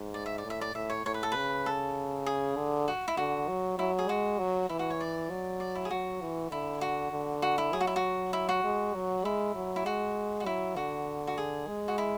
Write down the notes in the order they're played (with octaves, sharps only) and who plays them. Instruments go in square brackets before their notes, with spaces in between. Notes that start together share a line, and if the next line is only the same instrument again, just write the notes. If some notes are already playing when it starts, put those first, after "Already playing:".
Already playing: [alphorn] G#2
[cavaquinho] D5
E5
D5
[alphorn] A2
[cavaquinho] E5
D5
[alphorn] A2 [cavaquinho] E5
[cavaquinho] C#5
[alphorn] A2 [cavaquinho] C#5
[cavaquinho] B4
A4
[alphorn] C#3 [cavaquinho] B4
[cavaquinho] A4
G#4
[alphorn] D3
[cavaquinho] F#4
E4
[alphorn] D3 [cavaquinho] F#4
[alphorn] F#3
[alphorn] F#3 [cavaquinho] E4
[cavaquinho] G#4
[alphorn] G#3 [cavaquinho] F#4
[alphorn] F#3
[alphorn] E3 [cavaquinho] E4
[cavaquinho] F#4
C#5
D5
[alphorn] F#3
[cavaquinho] D5
E4
G#4
[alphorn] F#3 [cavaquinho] F#4
[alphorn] E3
[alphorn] D3 [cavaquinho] E4
[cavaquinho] F#4
[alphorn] D3
[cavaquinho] F#4
E4
[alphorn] F#3 [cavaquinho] G#4
[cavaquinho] F#4
E4
F#4
E4
F#4
[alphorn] G#3
F#3
[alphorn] G#3 [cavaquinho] E4
[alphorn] F#3
[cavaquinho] E4
[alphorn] G#3 [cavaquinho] F#4
[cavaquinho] F#4
[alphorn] F#3 [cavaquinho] E4
[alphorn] D3 [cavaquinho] F#4
[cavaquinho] F#4
G#4
[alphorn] G#3
[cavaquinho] F#4
E4